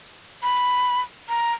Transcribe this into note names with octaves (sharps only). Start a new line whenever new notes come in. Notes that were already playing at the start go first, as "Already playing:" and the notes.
B5
A#5